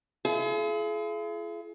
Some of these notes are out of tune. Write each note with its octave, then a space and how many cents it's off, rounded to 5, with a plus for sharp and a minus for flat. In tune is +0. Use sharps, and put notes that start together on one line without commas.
F4 -45 G#4 +40